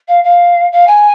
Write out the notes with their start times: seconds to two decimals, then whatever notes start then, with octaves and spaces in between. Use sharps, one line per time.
0.08 F5
0.24 F5
0.72 F5
0.87 G#5